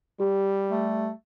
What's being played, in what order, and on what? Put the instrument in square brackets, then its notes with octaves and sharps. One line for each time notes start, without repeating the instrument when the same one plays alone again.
[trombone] G3 [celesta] G4
[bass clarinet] A3